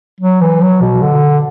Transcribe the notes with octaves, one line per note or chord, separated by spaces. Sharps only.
F#3
E3
F#3
B2
D3